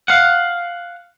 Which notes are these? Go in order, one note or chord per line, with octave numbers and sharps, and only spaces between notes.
F5 F#5